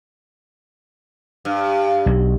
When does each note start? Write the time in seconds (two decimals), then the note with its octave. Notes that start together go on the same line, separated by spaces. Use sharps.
1.45 G2
2.06 B1